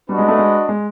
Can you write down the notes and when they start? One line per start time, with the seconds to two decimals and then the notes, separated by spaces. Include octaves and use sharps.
0.09 G3 D4 F#4 B4 D#5
0.18 G#3
0.28 A3
0.39 G#3
0.69 G#3